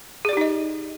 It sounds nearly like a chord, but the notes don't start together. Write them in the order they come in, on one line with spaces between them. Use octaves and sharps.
G#4 D5 G4 D#4 D#5